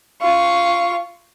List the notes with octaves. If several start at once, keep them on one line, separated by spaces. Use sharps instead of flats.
F4 C#6